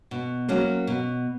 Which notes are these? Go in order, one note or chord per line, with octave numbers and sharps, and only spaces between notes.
B2
F#3 A#3 C#4
B2